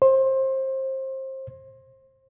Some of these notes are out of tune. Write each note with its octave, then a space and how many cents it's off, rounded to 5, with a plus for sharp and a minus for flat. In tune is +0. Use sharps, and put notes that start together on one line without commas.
C5 +25